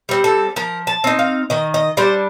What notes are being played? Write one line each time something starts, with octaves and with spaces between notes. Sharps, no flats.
G3 C4
A4
F3 A#4
A5
C4 D#4
F5
D#3 D#5
D#5
G3 D4 C5